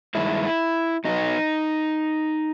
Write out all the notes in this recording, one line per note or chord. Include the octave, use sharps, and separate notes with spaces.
G2 D#3 G#3 E4
B2 F#3 B3 D#4